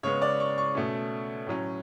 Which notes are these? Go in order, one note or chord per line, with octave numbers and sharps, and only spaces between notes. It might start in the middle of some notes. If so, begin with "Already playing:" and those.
C#3 G#3 B3 C#5
D5
C#6
C#6
B2 A3 C#4
A2 F#3 C#4